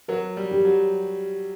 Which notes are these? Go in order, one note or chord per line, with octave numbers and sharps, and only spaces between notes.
F#3 A#4
G3
G4
F#3